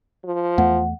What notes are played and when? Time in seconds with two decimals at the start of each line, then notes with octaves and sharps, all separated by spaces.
0.25 F3
0.58 E2 A3 F#5